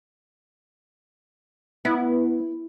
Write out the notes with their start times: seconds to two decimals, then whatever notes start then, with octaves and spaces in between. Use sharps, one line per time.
1.85 B3 E4